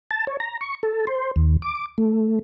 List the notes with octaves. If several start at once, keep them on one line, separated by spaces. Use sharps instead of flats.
A5
C#5
A#5
C#6
A4
C5
D#2
D6
A3